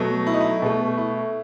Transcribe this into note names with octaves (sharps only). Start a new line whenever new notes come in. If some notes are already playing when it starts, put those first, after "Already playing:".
Already playing: B2 F#3 A3
E4
D#4
E4
B2 A3
E4